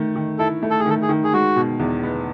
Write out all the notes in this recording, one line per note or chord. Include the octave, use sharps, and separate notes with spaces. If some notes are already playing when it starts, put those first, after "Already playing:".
Already playing: D#3 A3
D#3
E4 A4
A3
A4
G#4
D#3 A4
G#4
D#3
G#4
G#3 F#4
B2
E2
B3